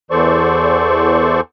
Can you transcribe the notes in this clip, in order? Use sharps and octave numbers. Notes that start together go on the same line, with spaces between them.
E2 E3 A4 C5 D5 C#6